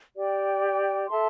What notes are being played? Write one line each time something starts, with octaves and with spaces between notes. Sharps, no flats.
G4 D5 G5
A4 E5 A5 C6